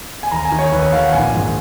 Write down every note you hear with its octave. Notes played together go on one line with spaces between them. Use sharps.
G#5
D#2 A#5
G#5
D#3
C#5
D#2 B4
C#5
D#3 F5
F#5
A#1 G#5
G#2 D#3